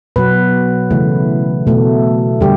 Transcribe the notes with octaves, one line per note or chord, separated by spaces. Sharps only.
B2 F#3 B3 B4
C#3 E3 A3
B2 A3
D3 G3 G4